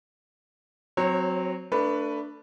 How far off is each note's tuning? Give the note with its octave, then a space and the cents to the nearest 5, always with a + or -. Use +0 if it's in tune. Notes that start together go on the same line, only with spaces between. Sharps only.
F#3 +0 C4 +0 C#5 -30
A3 +30 D4 +0 B4 +0